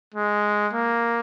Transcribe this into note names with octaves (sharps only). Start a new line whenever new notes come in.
G#3
A#3